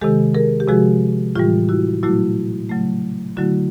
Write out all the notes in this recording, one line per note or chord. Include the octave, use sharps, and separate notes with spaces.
C3 D#3 G#3 G4 A4
G#4 A#4
G4
C3 F3 G#3 F#4 G#4
A2 E3 G3 F4 G4
E4 F#4
A#2 F#3 A3 E4 F#4
C#3 F#3 A3
D3 F#3 A3 E4 F#4